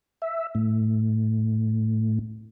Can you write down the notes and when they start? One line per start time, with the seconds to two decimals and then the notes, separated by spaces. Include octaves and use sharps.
0.22 E5
0.55 A2